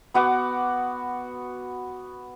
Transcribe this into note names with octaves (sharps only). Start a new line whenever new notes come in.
B3 F#4 F#5 D6